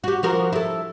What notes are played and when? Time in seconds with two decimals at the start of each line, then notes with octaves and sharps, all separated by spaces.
0.04 F#4 G4
0.23 F3 F#4 A#4
0.53 E4 A4